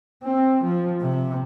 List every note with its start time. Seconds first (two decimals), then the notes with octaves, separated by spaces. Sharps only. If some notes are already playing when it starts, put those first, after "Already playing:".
0.24 C4
0.64 F3
1.01 C3